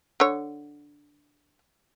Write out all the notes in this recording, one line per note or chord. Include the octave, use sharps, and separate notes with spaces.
D3 C#5